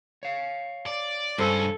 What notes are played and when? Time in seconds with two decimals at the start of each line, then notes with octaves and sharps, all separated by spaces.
0.23 C#5 F5
0.86 D5
1.38 C#2 G2 C#4 A4 C5